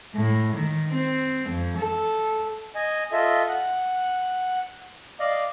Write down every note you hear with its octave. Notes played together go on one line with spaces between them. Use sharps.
A2
D#3
C4
F2
A4
D#5 G#5
F4 A4 D#5 E5
F#5
D5 D#5 F5